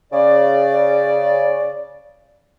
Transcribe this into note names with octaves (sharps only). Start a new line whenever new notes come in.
C#3 D5